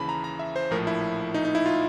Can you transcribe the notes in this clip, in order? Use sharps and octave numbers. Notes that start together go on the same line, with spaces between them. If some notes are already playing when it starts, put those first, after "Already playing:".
Already playing: D#2 C#3 E3 A5 B5
A#5
A#5
E5
C5
A#1 A2 F3 A#4
E4
D#4
D#4
E4
F4